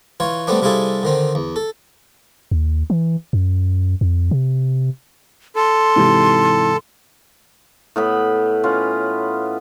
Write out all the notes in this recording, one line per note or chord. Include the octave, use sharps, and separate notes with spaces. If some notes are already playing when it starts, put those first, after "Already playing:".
E3 F4 C#5
G3 A3 B3 C4 D4
C3 G3 E4 F4 G#4 A4
D3 D#3 C4
E2
A4
D#2
E3
F#2
F2
C3
A4 C6
G#2 C3 E3
A2 B3 B5
C#4 F4 B4